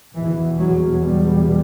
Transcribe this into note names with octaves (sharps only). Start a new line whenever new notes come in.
E2 B2 E3
F#3
G3